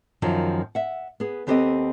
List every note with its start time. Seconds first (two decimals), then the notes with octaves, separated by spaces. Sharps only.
0.22 F#2 D#3 F3 F4 F#4
0.75 E5 F#5
1.20 B3 G#4
1.47 D#2 B3 C4 G4 A4 D#5